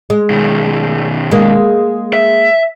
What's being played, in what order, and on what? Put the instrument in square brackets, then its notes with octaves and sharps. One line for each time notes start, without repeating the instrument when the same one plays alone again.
[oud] G#3
[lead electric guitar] B2 D#3
[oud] G#3 A#3
[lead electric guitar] E5